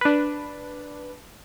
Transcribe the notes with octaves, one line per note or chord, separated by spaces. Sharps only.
D4 B4